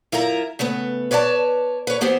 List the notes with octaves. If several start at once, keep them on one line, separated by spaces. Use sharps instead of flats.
F#2 E4 F4 A#4 A#5
C#3 A3 B3 B4
B4 C#5 D5 F5 A5
B4 C#5
E3 B3 G4 G#4 C5